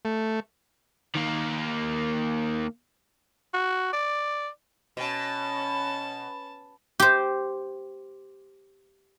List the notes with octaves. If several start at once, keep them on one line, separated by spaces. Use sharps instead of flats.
A3
D#3 A#3
F#4
D5
B2 C#4 A5
G4 C5